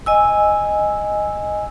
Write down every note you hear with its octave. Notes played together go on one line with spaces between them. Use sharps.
D#5 G#5 E6